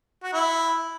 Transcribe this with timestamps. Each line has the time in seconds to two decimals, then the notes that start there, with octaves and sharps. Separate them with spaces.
0.23 F#4
0.33 E4